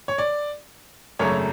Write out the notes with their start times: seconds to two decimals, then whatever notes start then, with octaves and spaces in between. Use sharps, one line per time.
0.08 C#5
0.18 D5
1.19 G#1 F#2 C#3 F#3 A3 C#5